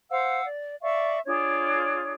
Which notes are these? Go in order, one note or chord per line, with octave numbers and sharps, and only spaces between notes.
C5 F5 F#5 E6
D5
D5 E5 F5 C#6
D4 F4 G#4 C#5